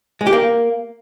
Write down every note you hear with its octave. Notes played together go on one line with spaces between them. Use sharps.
G#3
G4
A#3